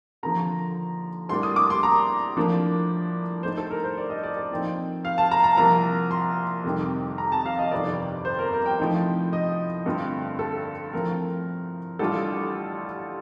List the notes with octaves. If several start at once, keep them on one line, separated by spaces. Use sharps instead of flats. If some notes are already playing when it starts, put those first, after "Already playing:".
D#2 D3 F3 A#5
A#1 A2 G3 A#3 D4 C6
D#6
D6
C6
A#5
A2 F3 A#3 D4
A2 A3 D#4 C5
A4
A#4
C5
D5
D#5
D5
D5
A#2 F3 C4 D#4
F5
A5
A#5
A#5
C2 A#2 F3 A#3 A#5
C6
F2 C3 D#3 G3
A#5
A5
F5
D#5
G1 F2 C3 D#3 D5
C5
A#4
A#4
G5
A2 F3 C4 D#4
D#5
G2 D3 A3 C4 F4
A4
A2 F3 C4 A#4
A1 A2 G3 D4 F4 A4